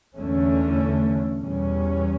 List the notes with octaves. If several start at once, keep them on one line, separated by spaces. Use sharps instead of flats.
E2 D3 A3 C#4
E2 B2 G3 C#4